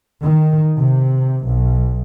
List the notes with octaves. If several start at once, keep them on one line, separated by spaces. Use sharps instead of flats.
D#3
C3
B1